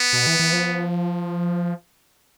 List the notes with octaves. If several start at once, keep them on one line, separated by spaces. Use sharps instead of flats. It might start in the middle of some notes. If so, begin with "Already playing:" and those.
Already playing: B3
B2
E3
E3
F3